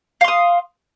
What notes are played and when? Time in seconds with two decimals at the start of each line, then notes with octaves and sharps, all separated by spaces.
0.21 F5
0.24 C6
0.28 D#6